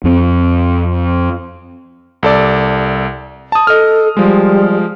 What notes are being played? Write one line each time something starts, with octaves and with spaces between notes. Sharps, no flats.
F2 C4
C2 A4 D5
A5 D#6
A4 D#5 F6
F3 G3 G#3